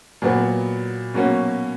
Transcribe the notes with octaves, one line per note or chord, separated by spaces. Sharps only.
A#2 F#3 B3
B2 F#3 A#3 C#4 F#4